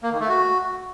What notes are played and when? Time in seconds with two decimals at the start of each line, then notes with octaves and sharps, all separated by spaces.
0.03 A#3
0.12 D#3
0.20 A3
0.29 F#4